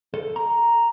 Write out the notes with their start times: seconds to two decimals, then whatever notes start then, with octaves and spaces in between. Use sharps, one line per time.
0.14 A4
0.36 A#5